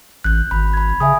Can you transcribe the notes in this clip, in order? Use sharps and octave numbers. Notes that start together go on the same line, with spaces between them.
A1 F#6 G6
G#1 B5
B5 G#6
C#3 E5 G#5 D#6